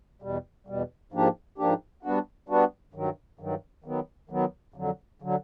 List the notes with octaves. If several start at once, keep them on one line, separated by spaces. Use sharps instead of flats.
E2 B2 G3
E2 B2 G3
G#2 F3 A#3 D4 G4
G#2 F3 A#3 D4 G4
G3 B3 D4 F#4
G3 B3 D4 F#4
G2 D#3 F#3
G2 D#3 F#3
D#3 F#3 B3
D#3 F#3 B3
F2 D3 F#3
D3 F#3